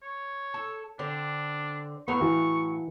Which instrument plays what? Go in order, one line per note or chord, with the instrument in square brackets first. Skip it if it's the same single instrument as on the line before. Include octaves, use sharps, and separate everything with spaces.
[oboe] C#5
[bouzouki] A4
[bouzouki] D3 C4 [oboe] D4
[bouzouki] A2 F#3 F5 [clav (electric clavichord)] B3 B4 [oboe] C#6
[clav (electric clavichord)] E3 F#4